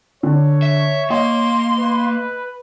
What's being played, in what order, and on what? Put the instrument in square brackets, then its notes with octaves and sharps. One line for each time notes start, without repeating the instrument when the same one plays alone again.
[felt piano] D3 [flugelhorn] C#5
[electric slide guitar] E5
[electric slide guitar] A#3 [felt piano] D#5 [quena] C6
[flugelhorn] B4